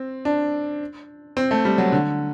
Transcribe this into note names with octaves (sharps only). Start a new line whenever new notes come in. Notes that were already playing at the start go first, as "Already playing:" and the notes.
Already playing: C4
D4
C4
A3
G3
F#3
D3